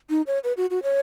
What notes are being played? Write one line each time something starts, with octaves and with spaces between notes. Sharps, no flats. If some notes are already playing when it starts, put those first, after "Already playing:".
D#4
C#5
B4
F#4
F#4
C#5